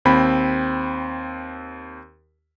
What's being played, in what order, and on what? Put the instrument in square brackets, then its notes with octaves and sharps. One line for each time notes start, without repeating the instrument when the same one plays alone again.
[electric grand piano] D#2 C4 B5